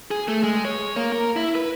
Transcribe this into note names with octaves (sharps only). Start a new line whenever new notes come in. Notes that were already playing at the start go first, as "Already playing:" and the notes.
G#4
A3
G#3
C#5
A#3
A#4
E4
B4